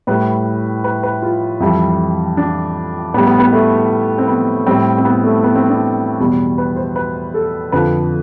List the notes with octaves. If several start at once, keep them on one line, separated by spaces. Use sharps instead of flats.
A2 G3 B4
B4
B4
F4
F2 E3 G3 E4
D4
A2 G3 B3
B3
B3
A3
C4
B3
A2 G3 C4
C4
B3
A3
B3
C4
D4
E2 B2 G3
B4
C5
B4
A4
F2 D3 F3 B4